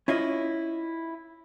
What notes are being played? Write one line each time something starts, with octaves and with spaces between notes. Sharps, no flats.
C#4 E4 F4 D#5